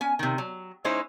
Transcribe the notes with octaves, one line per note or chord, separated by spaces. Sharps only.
C#4 G#5
C3 D#3
F#3
G#3 C#4 D#4 E4 C5